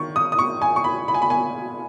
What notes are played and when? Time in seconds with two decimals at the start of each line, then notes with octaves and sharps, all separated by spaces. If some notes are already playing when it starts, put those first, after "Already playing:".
Already playing: D#3 C#6
0.16 D#6
0.32 D#6
0.39 C#6
0.62 G#5
0.76 C#6
0.84 B5
1.08 B5
1.14 G#5
1.22 B5
1.30 G#5